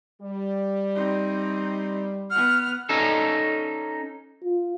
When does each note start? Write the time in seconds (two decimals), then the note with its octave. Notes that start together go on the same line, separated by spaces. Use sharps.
0.21 G3
0.95 C4 D#4
2.31 B3 F#5 F6
2.89 C#4 D#4 A4
4.44 F4